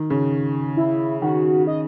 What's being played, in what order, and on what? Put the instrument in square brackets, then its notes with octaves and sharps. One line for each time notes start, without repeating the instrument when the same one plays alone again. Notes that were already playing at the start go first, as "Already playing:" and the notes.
Already playing: [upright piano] D#3
C#3
[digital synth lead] E4
[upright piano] D#3 [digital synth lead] F#4
[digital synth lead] D#5